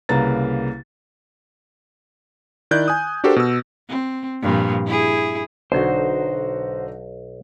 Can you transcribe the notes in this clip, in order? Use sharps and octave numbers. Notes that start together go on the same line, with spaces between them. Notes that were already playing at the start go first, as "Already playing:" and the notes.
C2 C#3 A#3 B4 A#5 A6
D#3 E4 D5 F#6 G6
G#5 D#6
D4 F#4 G4 A4 A#4 C5
B2 E6
C4
G2 A#2 F3
E4 G#4
B1 D3 D#4 F#4 C5